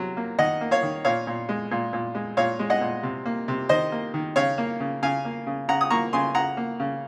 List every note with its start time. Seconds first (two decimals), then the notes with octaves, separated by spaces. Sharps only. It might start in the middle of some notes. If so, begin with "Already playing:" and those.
Already playing: C3 F#3
0.17 A#3
0.39 D#3 D#5 F#5
0.61 A#3
0.71 C#5 F5
0.83 D#3
1.05 A#2 C#5 F5
1.27 A#2
1.49 G#3
1.71 A#2
1.93 A#2
2.15 G#3
2.37 A#2 C#5 F5
2.59 G#3
2.70 D#5 F#5
2.81 A#2
3.03 C3
3.25 A#3
3.48 C3
3.69 D#3 C5 D#5
3.92 A#3
4.14 D#3
4.36 C#3 C#5 F5
4.58 A#3
4.80 C#3
5.02 C#3 F5 G#5
5.25 A#3
5.47 C#3
5.68 C#3 F#5 A#5
5.81 D#6
5.90 A#3 A#5 C#6
6.13 C#3 G#5 C6
6.35 C#3 F#5 A#5
6.57 A#3
6.80 C#3